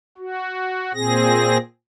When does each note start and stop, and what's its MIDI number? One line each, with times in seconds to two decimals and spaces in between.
0.18 0.92 66
0.94 1.58 46
0.94 1.58 60
0.94 1.58 68
0.94 1.58 94